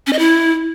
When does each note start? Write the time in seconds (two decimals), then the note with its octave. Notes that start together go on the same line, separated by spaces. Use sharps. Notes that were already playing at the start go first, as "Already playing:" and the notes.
0.07 C#4
0.13 D#5
0.19 E4